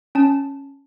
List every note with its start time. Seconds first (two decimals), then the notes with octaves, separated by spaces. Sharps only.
0.15 C#4 A5